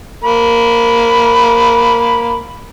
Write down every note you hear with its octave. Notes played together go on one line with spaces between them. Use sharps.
A#3 B5